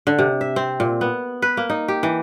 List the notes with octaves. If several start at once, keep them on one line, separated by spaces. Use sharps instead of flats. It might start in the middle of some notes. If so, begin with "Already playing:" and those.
D3
C3
E5
C4
A#2
B3
B4
A#3
D#4
G4
E3